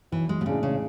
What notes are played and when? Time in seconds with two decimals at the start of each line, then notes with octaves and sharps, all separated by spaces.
0.12 B1 E3
0.29 G#3
0.41 B2
0.46 A2 C#3 G#3 D4 G#4
0.63 C#3